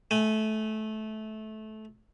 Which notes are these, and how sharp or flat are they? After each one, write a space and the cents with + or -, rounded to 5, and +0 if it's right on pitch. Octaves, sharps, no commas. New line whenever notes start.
A3 -20 G#5 +0